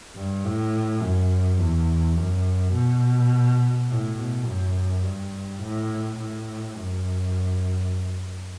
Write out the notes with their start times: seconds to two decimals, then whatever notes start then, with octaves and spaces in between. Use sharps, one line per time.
0.16 G2
0.44 A2
1.01 F#2
1.59 E2
2.16 F#2
2.73 B2
3.89 A2
4.17 B2
4.46 F#2
5.03 G2
5.60 A2
6.19 A2
6.76 F#2